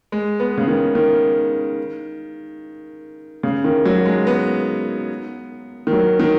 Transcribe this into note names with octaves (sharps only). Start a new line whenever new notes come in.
G#3
B3
C#3
D#3
D#3
C#3
D#3
F#3
G#3
B3
D#3
F#3
D#3